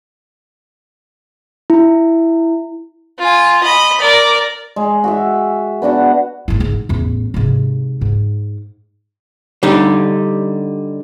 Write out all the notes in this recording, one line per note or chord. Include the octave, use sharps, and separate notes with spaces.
E4
F4 G#5
D#5 B5
A#4 D5
G#3
F#4 G#4 E5
B3 D4 F#4 F#5
G1 E4
G#2
A1 E2
G#2 C3
G#2
D3 G3 D#4